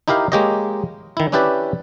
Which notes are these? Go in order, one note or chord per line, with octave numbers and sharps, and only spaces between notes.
D#4 E4 G4 A#4 F5
G#3 A#3 G4 C#5 D#5
D#3 E4
C#4 D4 E4 G4 B4 D5